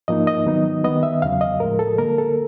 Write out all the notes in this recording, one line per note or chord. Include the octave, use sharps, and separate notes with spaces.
G#2 F3 A#3 D#4 D#5
D#5
D#3 F#3 B3 D#4
D#3 G3 B3 D#5
E5
E2 C#3 F#3 F5
D#5
A2 F3 G#3 A#4
A4
D3 G3 A#3 A#4
A4